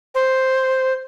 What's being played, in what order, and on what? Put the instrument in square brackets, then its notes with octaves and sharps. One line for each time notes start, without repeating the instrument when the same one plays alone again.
[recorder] C5